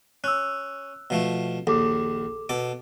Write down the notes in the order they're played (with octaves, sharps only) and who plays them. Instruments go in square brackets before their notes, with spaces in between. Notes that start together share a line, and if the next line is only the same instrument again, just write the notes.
[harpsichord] C#4 [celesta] E6 F#6
[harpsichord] B2 F3 A3
[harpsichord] A#1 D#2 [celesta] A4 D6
[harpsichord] B2 A4 D6